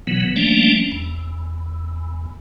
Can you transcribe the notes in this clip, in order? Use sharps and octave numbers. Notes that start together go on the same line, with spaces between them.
B2 E3 F#3 B3
F3 G3 A3 A#3 C#4 D4
E2